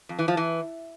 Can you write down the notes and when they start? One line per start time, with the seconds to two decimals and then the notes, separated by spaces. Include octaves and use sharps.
0.09 F2
0.19 E3
0.28 F3
0.37 E3